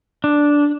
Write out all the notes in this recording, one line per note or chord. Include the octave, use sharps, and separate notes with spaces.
D4